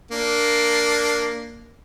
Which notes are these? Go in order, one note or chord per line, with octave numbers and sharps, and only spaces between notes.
A#3 D4